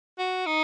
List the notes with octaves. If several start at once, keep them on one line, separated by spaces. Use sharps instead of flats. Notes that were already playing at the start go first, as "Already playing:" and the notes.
F#4
D#4